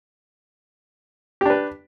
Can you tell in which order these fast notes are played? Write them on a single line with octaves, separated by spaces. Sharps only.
G4 D4 B4